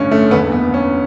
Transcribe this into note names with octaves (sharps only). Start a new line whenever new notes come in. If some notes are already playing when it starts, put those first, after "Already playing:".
Already playing: A1 G2 D3 C#4
A3
F#1 E2 D3 B3
B3
C#4